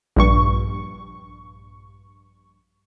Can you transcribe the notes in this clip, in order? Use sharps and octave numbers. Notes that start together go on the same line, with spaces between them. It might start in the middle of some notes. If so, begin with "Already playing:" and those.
A#1 G2 C#6